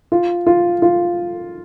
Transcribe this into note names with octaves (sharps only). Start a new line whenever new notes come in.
F4
F4
F4